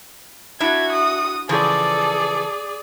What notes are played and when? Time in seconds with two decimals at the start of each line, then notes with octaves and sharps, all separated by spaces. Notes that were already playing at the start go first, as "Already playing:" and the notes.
0.60 D4 E4 F#4 E5 G#6
0.93 D#6
1.49 C#3 E3 F3 G#4 A4 D5